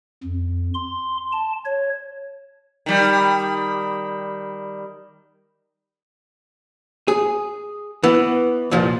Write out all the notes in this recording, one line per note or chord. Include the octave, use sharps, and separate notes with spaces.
F2
C6
A5
C#5
D#3 G3
G#4
E3 B3
C2 F2 A#2 F3